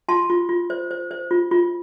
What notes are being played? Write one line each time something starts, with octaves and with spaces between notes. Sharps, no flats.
F4 A5 C6
F4
F4
C5
C5
C5
F4
F4